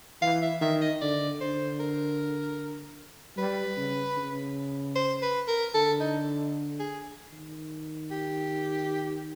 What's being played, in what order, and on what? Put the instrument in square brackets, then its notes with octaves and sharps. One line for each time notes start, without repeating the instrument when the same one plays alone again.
[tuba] E3 [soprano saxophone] F5
[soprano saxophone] E5
[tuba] D#3 [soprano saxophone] E5
[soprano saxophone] D#5
[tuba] D3 [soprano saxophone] D5
[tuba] D3 [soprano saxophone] C5
[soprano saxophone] A#4
[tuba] G3 [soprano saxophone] B4
[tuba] C#3
C#3
[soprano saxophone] C5
B4
A#4
[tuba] D3 [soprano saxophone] A4
[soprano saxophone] D#4
G#4
[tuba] D#3
[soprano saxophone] G4